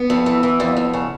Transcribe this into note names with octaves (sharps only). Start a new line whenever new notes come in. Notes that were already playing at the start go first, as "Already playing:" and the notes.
Already playing: B3
F2
E3
E3
F2
F2
C#3